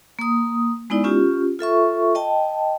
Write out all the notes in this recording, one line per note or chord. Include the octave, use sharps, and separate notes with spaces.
A#3 D#6
G#3 B3 D#4 E4 D5
C#4 F4 G4
F4 A4 E5 C#6
D#5 G5 A5